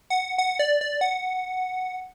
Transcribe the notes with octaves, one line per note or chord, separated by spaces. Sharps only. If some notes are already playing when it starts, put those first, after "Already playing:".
F#5
F#5
D5
D5
F#5